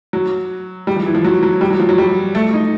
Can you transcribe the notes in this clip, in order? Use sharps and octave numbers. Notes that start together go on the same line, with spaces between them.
F#3
G3
F3
E3
F3
F#3
F#3
G3
F#3
F3
F#3
G3
A3
D#4